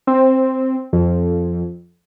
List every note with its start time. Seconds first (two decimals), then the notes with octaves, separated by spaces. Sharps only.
0.07 C4
0.93 F2